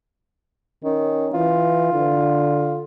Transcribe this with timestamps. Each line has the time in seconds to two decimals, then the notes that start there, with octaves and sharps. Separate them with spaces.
0.84 D#3 C#4
1.34 E3 F4
1.93 D3